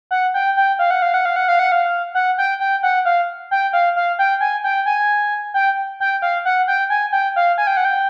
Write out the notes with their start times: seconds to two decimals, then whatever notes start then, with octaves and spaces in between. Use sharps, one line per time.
0.11 F#5
0.34 G5
0.57 G5
0.79 F5
0.91 F#5
1.02 F5
1.14 F#5
1.25 F5
1.36 F#5
1.48 F5
1.59 F#5
1.72 F5
2.15 F#5
2.38 G5
2.60 G5
2.83 F#5
3.05 F5
3.51 G5
3.73 F5
3.96 F5
4.19 G5
4.41 G#5
4.64 G5
4.86 G#5
5.54 G5
6.00 G5
6.22 F5
6.45 F#5
6.68 G5
6.90 G#5
7.12 G5
7.36 F5
7.58 G#5
7.67 G5
7.77 F#5
7.85 G5